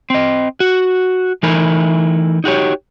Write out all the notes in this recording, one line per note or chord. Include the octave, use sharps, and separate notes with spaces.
C4 D#5
F#4
E3 A3 D#4 E4 A#4 G#5
D#4 F#4 G4 C#5